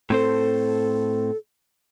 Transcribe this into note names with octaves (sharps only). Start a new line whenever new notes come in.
A2 C4 A4 C5